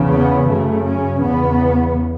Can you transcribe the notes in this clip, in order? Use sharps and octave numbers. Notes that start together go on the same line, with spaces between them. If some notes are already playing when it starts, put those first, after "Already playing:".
Already playing: E2 C#3
B3
F#2 C#3 A3
C#4
E2 C#3 B3